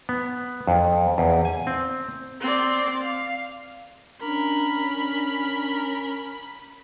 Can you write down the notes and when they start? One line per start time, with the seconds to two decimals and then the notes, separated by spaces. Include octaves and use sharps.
0.09 B3
0.67 F2
1.18 E2
1.45 G#5
1.67 C4
2.40 C4 D5
3.02 F5
4.22 C#4 D4 A#4 B5